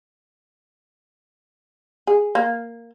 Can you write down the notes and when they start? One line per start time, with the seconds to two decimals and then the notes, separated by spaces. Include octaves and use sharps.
2.07 G#4
2.35 A#3